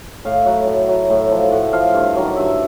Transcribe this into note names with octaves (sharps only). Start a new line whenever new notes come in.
A2 F5
F#3 F#5
A2
F#3
A2
F3
A2 F#5
F3 F5
G2
D#3 F#3
G2 E5